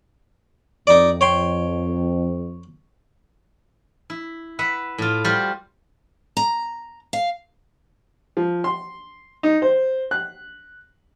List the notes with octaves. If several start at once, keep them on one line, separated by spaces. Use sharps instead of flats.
F2 D#4 D5
C#5 G5 C6
E4
B4 E5 F#5
A2 F4
G3 F4 F#4 C5
A#5
F5
F3
C6
D#4
C5
F#6